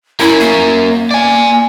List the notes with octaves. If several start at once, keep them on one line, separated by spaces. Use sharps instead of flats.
C#4 E4 A#4
A#3
D5 G#5